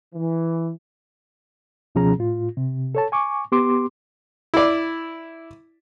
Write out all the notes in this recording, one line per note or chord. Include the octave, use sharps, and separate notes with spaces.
E3
C#2 B2 F3 C#4 G#4 A#5
A2 F4
C3
A4 C#5 A5
G#5 C#6 D6
B3 G4 C6 D6
E4 D5